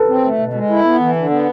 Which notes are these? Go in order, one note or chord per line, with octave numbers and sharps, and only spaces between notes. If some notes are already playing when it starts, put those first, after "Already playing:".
Already playing: A4 B4
C4
A3
B2
G#3
E4
B3
E3
D3
B3